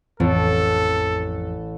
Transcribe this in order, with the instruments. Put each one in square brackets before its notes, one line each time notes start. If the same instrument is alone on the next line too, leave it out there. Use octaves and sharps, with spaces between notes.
[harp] A1 [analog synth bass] F2 [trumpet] A4